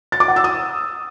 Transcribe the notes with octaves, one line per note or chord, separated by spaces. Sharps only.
A6
D6
F#5
E6
D#6